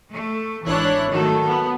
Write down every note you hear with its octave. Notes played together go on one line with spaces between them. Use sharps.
A3
G#1 E3 D4 E4 C#5 F#6
D#3 F#3 A3 A4
B3